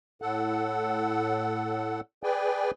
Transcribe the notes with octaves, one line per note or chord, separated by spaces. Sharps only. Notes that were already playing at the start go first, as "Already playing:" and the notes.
A2 A4 F#5
G#4 B4 D5 G5 G#5